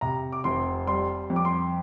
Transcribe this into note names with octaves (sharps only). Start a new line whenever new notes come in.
C3 A#5
D6
F1 C6
G3 C6
F2
D6
C6